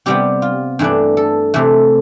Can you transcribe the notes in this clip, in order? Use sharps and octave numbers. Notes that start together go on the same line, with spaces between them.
C3 G3 B3 G4
F4
G2 E3 A3 D4
A4
C3 E3 A3